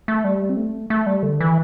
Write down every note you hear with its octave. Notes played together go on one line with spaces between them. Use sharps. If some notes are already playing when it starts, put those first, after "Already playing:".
A3
G3
C4
A3
A3
G3
D3
E3